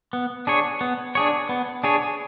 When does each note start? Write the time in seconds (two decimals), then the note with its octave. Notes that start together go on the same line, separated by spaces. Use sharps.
0.13 B3
0.47 D4 G#4 C#5
0.81 B3
1.15 D4 G#4 C#5
1.49 B3
1.84 D4 G#4 C#5